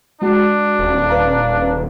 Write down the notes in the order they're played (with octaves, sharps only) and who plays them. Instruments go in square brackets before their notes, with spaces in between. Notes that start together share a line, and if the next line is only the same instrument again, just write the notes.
[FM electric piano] G#3 F#4 [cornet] D4
[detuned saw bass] D#1
[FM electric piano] B4 F5 A#5